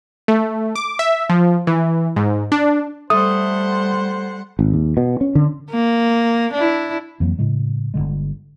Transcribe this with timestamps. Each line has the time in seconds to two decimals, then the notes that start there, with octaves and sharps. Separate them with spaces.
0.28 A3
0.75 D6
0.99 E5
1.30 F3
1.67 E3
2.16 G#2
2.52 D4
3.10 G3 A3 C5 F#5 D#6
4.59 G#1
4.74 D#2
4.97 B2
5.21 C#4
5.35 D3
5.70 A#3
6.54 D4 E4
7.20 F2 E3 F#3 A#3
7.39 A2 C#3 G#3
7.94 G1 C#2 D3 G#3